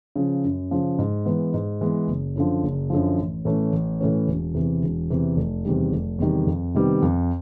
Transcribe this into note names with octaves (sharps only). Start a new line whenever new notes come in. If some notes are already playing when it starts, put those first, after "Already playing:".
C#3 F3
F#2
C#3 F3
G#2
E3 G#3 B3
G#2
E3 G#3 B3
F#1
F#2 D3 F3
F#1
F#2 D3 F3
A1
A2 E3 A3 C#4
A1
A2 E3 A3 C#4
E1
E2 C3 E3
E1
E2 C3 E3
F1
E2 C3 D#3 G3
F1
E2 C3 D#3 G3
F2
C3 D#3 G3 B3
F2